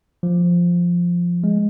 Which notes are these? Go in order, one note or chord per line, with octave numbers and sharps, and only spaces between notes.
F3
G#3